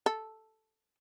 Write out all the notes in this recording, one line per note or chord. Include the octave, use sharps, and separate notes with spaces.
A4